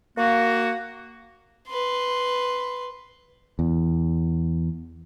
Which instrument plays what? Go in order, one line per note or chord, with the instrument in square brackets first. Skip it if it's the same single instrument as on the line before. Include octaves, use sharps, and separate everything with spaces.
[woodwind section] A#3 F#4
[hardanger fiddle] B4 C6
[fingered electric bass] E2